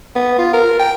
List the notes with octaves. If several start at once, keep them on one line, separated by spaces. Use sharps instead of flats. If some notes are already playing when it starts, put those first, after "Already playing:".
B3
F4
A#4
G5